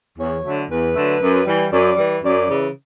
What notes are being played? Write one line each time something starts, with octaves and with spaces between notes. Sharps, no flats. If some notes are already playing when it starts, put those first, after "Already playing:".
E2 C#5
D3 F#3 A3
E2 B4
D3 F#3 A3
F#2
E3 G3
F#2 D5
E3 G3
F#2 D5
C#3 E3